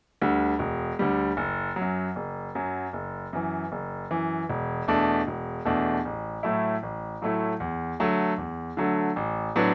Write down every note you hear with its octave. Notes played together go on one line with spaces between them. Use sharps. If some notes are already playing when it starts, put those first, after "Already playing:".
D2 D3 G3
E1
D2 D3 G3
F#1
F#3
F#2
F#1
F#2 F#3
F#1
F#2 E3
F#1
F#2 E3
E1
E2 B2 A3 D4
E1
E2 B2 A3 D4
A1
A2 F#3 A3 E4
A1
A2 F#3 A3 E4
E2
D3 F#3 A3
E2
D3 F#3 A3
A1
A2 F#3 B3 D4